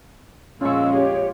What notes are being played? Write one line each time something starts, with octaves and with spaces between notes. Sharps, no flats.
A#1 F2 G#3 C#4 F4 C#6 E6
G4 C#5